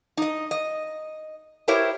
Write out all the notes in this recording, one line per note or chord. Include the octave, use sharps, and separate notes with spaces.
D#4 D#5
D#5
E4 G4 A#4 C5 C#5 E5